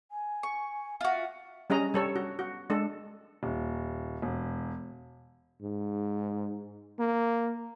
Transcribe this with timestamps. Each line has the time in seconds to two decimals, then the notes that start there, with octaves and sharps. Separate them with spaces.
0.11 G#5
0.43 C#6
1.01 F4 F#4 E5
1.70 G3 C#4 G#4 D#5 A#5
1.94 G3 A4 C#5
2.16 F#4
2.39 F#4
2.70 G#3 D4 A4
3.43 D#1
4.22 E1
5.62 G#2
6.99 A#3